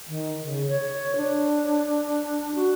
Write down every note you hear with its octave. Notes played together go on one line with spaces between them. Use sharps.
D#3
C#3
C#5
D4
F#4